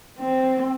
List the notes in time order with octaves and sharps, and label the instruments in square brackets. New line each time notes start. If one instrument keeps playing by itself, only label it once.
[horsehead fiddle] C4